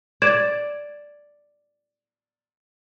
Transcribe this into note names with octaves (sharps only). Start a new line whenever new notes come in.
D5 G#6 E7